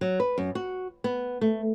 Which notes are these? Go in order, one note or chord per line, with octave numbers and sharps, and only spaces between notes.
F#3
B4
F#2
F#4
B3
A3